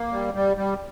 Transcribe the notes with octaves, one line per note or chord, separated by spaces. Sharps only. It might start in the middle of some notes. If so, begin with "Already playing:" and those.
Already playing: A#3
G3
G3
G3